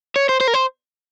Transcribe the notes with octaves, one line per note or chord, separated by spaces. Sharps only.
C#5
C5
C5
A#4
C5